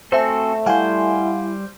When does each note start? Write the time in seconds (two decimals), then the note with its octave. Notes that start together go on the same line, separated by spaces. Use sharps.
0.12 A3 C4 F#4 A4 C5 E5 G#5
0.66 G3 E4 C5 F5 F#5 G#5